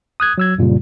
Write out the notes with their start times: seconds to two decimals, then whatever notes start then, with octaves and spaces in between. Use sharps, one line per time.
0.20 D#6 F#6 G#6
0.38 F#3 E6 G#6
0.58 F#2 A#2 C#3 G3